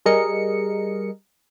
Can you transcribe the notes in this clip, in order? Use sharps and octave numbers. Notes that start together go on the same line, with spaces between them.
G3 G#4 A#4 D#5 C#7